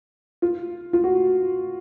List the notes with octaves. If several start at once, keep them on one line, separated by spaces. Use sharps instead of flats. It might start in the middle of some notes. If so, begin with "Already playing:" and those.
F4
F4
F#4